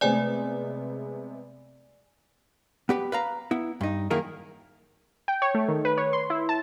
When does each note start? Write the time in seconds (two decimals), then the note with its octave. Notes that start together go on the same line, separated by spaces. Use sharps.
0.01 C3 G#3 A3 B3 C5 D5 G#5
2.89 B3 G4 B4
3.12 B4 F5 A#5
3.51 B3 E4
3.81 G2 D#4
4.10 F#2 D#3 A#3 E4 G#4 A#4
5.28 G5
5.42 C#5
5.55 A3
5.69 D#3
5.85 B4
5.98 C#5
6.13 C6
6.30 E4
6.49 A5